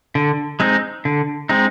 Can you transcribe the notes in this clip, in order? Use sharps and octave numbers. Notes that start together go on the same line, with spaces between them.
D3
G#3 C4 D#4
D3
G#3 C4 D#4